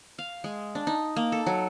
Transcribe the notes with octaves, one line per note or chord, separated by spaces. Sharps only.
F5
G#3
D4
D#4
A#3
A4
F#3